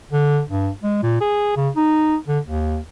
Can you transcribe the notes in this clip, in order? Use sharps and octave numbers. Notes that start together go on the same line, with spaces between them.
D3
G2
G#3
A#2
G#4
C#3
D#4
D3
D#2